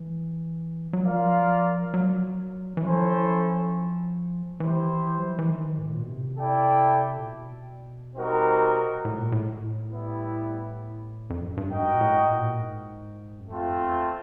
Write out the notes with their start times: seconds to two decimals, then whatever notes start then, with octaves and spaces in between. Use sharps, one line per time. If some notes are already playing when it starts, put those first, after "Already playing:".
Already playing: E3
0.93 F#3
1.05 F3 F4 A#4 D5 F5
1.94 F#3
2.77 E3
2.82 F3 C#4 E4 A4 C5
4.60 E3 E4 G4 C5
5.18 F#3
5.28 F3
5.39 E3
5.49 D#3
5.78 G#2
5.86 A2
5.93 A#2
6.01 B2
6.09 C3
6.38 E4 A4 D5 G5
7.17 A#2
7.27 B2
8.16 G3 C4 D#4 F#4 A#4
9.05 A2
9.18 A#2
9.32 A2
9.93 G3 B3 E4
11.30 F2
11.44 F#2
11.57 G2
11.71 G#2 F#4 A#4 D#5 G5
11.95 A#2
12.01 A2
12.30 A#2
12.60 G#2
13.40 F#2
13.48 F2 A3 C4 F4
13.78 E2